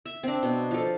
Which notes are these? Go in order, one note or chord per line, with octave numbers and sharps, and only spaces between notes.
E5
C4 D4
B2
F3 A4